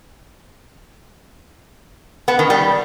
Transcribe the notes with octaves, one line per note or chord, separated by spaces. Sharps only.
B3
D#3
G3